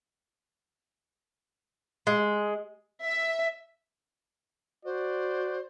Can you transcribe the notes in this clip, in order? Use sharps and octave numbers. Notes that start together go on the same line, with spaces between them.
G#3
E5
F#4 C5 D5